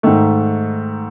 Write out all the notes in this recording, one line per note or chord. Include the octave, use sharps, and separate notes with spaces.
G#2 D#3 A3